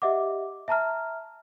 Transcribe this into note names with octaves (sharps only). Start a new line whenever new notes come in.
G4 D#5 E5 F#5 D6
E5 A5 A#5 F6